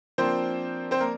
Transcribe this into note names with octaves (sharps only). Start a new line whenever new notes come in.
F3 A#3 C4 D4 C5
C4 C5
A#3 A#4